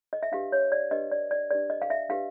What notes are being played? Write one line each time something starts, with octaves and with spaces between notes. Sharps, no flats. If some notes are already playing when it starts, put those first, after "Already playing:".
D#5
E5
D4 G4 B4 F5
C#5
D5
D4 G4 B4 D#5
D5
D5
D4 G4 B4 D5
D#5
F5
E5
D4 G4 B4 F5